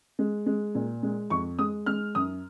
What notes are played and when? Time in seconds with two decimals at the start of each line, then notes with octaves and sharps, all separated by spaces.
0.19 G#3
0.46 G#3
0.75 A#2
1.03 G#3
1.30 F2 C#6
1.59 G#3 D#6
1.86 G#3 F6
2.15 F#2 D#6